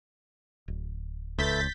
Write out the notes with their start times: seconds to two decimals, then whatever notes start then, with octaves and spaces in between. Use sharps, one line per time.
0.68 D1
1.39 C#2 A4 B4 E5 G6 A6 B6